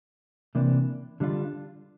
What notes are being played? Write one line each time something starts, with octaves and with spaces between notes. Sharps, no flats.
C3 E3 A#3 D4
D3 G3 D4 F4